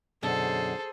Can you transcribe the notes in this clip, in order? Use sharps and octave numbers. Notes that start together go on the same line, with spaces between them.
F#2 B2 D3 G#4 A4 C5